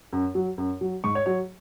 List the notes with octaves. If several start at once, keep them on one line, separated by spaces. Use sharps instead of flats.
F#2
F#3
F#2
F#3
G#2 C#6
C#5
F#3 C#5